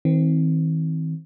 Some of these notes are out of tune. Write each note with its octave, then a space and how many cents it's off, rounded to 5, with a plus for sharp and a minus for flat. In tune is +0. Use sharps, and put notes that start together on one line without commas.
D#3 +45 C4 +0